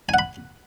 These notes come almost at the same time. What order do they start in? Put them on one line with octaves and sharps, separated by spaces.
G#5 F#5 B5